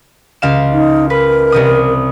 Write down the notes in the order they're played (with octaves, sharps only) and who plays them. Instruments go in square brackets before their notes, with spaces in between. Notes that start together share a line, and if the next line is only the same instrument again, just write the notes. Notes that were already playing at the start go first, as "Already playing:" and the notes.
[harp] C#2 F5 E7
[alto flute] D#4
[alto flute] A#4 [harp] B4
[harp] C2 C3 D#6